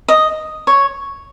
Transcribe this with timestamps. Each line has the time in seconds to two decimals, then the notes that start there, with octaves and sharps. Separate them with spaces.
0.08 D#5
0.67 C#5